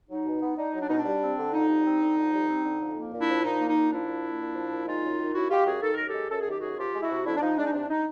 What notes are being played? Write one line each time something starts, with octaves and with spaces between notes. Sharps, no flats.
F#3 D#4
B2
B3
D4 D#4
F#3
D4
B2 D#4
D4
G3
C4
D3
F2 D#4
G3
C4
D3
F2
G3
C4
D3
F2
A#3
A#2
D4 E4
F3
A#2 D#4
A#3
D#4
A#2
F3 D4 E4
A#2
A#3
A#2
F3
A#2
G#3 D#4 F4
F#2
D#3
F#2 E4 F#4
G#3 F4 G4
F#2 F#4 G#4
D#3 A4
F#2 A#4
G4 A4
G#3
F#2 A4
G#4
D#3 G4
F#2 F#4 G#4
F3 F4 G4
G#3
E4 F#4
C3
F2 D4 E4
D4
F3 D#4
G#3 D4
D#4
C3 D4
D#4